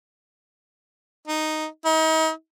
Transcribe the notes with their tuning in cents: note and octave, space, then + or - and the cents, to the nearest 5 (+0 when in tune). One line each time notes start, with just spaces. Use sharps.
D#4 -5
D#4 +40